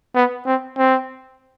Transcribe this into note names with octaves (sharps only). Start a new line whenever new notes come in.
B3
C4
C4